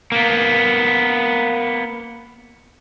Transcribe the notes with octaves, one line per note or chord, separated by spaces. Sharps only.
A#3 B3